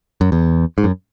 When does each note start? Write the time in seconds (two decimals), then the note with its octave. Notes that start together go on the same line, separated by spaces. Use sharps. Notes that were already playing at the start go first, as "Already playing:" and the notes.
0.21 F#2
0.32 E2
0.78 G#2
0.84 F#2